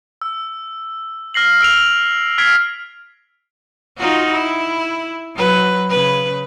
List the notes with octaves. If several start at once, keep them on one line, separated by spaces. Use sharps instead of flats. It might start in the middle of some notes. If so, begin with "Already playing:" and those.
E6
F6 A#6 C7 F#7
E6 D7 F7
F6 G#6 B6 C7 D7
D#4 F4 F#4
E4
F#3 B4
C#3 B4